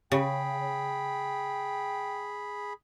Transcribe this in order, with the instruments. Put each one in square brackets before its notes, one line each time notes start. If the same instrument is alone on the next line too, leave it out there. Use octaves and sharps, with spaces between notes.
[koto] C#3 [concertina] G#4 B5 [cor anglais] G5